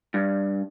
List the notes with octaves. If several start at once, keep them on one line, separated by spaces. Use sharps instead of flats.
G2